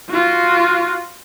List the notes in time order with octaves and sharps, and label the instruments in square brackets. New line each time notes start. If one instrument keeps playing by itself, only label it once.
[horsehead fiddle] F4 F#4